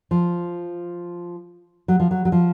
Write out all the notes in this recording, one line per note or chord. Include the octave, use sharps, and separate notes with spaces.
F3
F#3
F3
F#3
F#3
F3